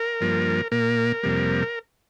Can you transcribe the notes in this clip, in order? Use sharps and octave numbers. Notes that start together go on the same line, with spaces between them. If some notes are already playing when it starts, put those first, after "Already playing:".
Already playing: A#4
G2 F3 A#3
A#2 A#3 A#4
F2 C3 G3 A#3